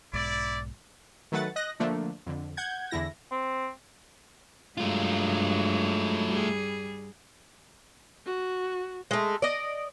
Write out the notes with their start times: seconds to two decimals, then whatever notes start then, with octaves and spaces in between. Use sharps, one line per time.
0.13 B1 G#2 E4 D5
1.32 D#3 F#3 A3 B4 F#5 A6
1.56 D#5 F#6 A#6
1.80 D3 F3 A3 A#3 D4
2.26 F2 D3
2.57 F#5 G6 G#6
2.91 E2 D3 E4 A#6
3.31 C4
4.77 G2 F#3 G#3 A3 F4
6.29 G3 G#4
8.26 F#4
9.11 G#3 A3
9.42 D5 D#5